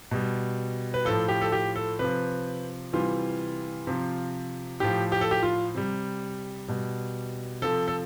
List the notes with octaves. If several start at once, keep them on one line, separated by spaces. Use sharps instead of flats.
B2 G3
B4
A2 F3 A4
G4
A4
G4
A4
C3 F3 B4
C3 E3 G3 F4
C3 F3
A2 F3 G4
G4
A4
G4
F4
C3 G3
B2 G3
C3 F3 A4
A4